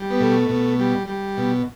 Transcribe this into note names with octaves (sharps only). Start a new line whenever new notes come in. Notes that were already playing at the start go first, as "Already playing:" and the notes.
Already playing: G3
B3
B2 A3
B2
G3
G3
B2